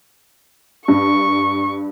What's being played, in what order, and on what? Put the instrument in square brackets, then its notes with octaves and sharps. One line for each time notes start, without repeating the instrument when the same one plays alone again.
[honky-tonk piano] G2 [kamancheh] C#6